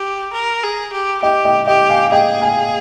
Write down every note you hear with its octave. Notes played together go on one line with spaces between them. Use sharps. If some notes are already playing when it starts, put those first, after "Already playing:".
Already playing: G4
A#4
G#4
G4
G4 D#5 G5
D#5 G5
G4 D#5 G5
F5 G#5
G#4 D#5 G5
F5 G#5